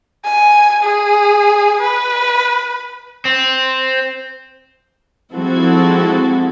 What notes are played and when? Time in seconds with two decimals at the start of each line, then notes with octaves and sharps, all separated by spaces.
0.24 G#5
0.83 G#4
1.81 B4
3.25 C4
5.34 F3 G#3 C4 E4 F#4 A4